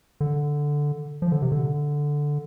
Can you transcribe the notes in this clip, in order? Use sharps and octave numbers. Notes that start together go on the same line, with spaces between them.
D3
F3
D3
C3
D3